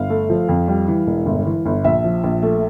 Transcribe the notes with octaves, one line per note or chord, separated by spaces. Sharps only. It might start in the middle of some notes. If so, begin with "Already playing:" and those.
Already playing: G1 F5
A3
F3
F2
G3
E3
E1
G1
E3
G1
A#1 E5
F3
A#1
A3